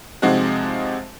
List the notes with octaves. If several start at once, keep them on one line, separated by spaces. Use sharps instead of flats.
C3 F3 G#3 C4 D#4 F#4